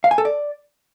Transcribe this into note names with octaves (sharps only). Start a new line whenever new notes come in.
F5
G#5
A4
D5